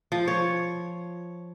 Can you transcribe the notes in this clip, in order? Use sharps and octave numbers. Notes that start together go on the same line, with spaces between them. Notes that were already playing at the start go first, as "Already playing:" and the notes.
F3
C#5